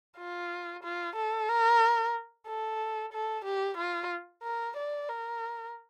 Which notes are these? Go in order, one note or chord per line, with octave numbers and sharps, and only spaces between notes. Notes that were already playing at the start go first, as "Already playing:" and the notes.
F4
F4
A4
A#4
A4
A4
G4
F4
A#4
D5
A#4